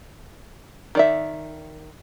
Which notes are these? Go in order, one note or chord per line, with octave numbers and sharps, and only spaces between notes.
D#3 D5 E5